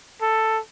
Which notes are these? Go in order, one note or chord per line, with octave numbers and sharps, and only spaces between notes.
A4